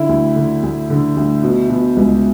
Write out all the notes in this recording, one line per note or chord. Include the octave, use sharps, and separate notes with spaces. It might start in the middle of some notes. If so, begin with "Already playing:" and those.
Already playing: D3 E4
D2
D3
D2
D3
D2
B2
B2
C#2